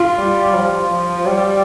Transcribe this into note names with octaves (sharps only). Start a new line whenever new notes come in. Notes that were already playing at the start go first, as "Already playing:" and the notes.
Already playing: F4
G3
F3
F3
G3